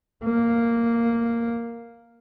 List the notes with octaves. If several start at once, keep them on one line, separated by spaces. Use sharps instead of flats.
A#3